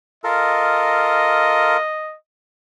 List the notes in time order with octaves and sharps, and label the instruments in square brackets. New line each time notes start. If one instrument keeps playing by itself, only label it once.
[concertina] F4 A4 A#4 [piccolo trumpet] D#5